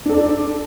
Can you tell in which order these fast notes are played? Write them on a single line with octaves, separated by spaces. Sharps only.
D4 A4 D5